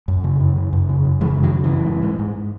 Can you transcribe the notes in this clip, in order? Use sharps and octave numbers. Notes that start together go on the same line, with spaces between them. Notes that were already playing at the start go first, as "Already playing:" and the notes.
F#2
C#3
F#2
C#3
F#2
C#3
F#2
C#3 E3 G#3
F#2
D#3 F#3
C#3
E3
F#2
G#2
G#2
G#2